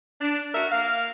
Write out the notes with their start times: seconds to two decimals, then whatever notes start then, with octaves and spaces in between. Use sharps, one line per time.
0.21 D4
0.55 F#4 A#4 E5
0.72 A#3 F5